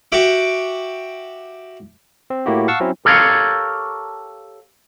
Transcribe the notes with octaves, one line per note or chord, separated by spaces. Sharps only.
F#4 G4 E5 D6
C4
A2 A#3 E4 F#4 G4
F5 F#5 A5 C#6 E6
F#3 C4 C#4 E4
G4 A4 A#4 C#5 F5